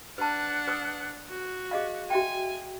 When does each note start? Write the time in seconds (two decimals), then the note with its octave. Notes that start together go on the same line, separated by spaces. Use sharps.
0.18 D4 B4 F#5 A5
0.67 B4 D#6
1.29 F#4
1.71 G#4 D#5 F5
2.10 F#4 E5 G5 G#5